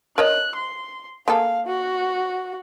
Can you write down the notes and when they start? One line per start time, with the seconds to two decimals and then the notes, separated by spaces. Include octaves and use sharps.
0.18 A#4 C#5 D#5 F#6
0.56 C6
1.28 A#3 G#4 A4 F5
1.67 F#4